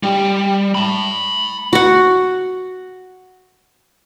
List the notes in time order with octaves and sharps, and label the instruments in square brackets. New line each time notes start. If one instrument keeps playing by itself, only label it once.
[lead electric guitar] G3
A5 B5
[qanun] F#4 F#5